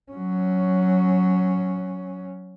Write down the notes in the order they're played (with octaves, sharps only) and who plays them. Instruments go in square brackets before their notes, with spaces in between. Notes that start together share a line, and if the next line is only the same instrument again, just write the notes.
[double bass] F#3 C#4